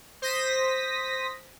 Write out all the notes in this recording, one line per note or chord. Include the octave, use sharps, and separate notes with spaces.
C5 D#6 A#6 B6